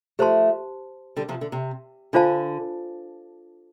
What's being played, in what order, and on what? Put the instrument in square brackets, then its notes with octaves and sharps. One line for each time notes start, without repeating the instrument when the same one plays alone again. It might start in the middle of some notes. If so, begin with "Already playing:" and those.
[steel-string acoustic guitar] F3 A3 [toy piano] G4 C5 A5 C6
[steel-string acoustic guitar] D3 G3
C3 F3
D3
C3
[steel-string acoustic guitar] D3 [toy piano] D4 F4 C5 F5 A5